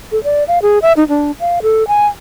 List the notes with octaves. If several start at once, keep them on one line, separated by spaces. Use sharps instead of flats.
A4
D5
F5
G#4
E5
D#4
D4
F5
A4
G#5